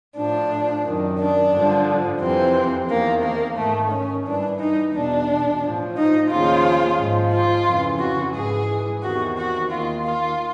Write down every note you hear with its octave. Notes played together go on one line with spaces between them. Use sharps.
A2 F3 D4
F#2 D#3
D4
G2 D3 F3
F2 C3 E3 C4
E2 C3 D#3 A#3
A#3
G#2 D#3 A3
C#4
G2 E3 D4
D#4
E2 B2 D4
A2 F3
D#4
D#2 C#3 F3 F4
G#2 F3
F4
F2 C#3 E3
F#4
G#2 E3 G#4
E2 C3 D#3 F#4
F#4
D#2 D#3 F4
F4